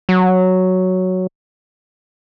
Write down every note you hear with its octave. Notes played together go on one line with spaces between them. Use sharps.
F#3